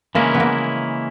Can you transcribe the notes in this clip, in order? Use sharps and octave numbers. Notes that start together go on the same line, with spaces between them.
C#3 E3 G#3 A#3 C#4 E4
B3
A#3